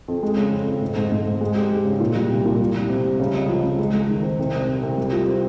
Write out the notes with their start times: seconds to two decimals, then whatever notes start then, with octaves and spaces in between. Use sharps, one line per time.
0.08 F2
0.23 G#3
0.37 C#3
0.52 F2
0.67 F2
0.81 G#2
0.96 G#2
1.12 G#2
1.27 G#2
1.41 G#3
1.55 G4
1.71 G#3
1.85 C#3
2.00 A#2
2.15 G3
2.30 C2
2.45 A#2
2.60 G3
2.75 G3
2.90 C3
3.05 G3
3.20 C#3
3.34 C#2
3.49 F3
3.63 C#2
3.78 G#3
3.93 G#3
4.09 D#3
4.23 C4
4.39 C2
4.54 C3
4.68 C3
4.83 C2
4.97 G3
5.12 F4
5.27 C4